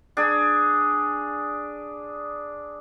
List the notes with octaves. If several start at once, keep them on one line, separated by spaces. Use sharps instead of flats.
D4 G#4